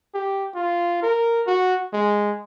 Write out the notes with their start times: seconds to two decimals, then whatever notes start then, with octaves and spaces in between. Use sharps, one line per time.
0.14 G4
0.56 F4
1.03 A#4
1.47 F#4
1.93 G#3